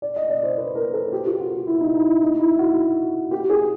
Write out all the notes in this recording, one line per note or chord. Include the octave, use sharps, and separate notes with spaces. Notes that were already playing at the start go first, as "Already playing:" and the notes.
D5
D#5
D5
C5
B4
A#4
A4
G4
F4
F#4
E4
D#4
D#4
E4
D#4
E4
F#4
G4
G#4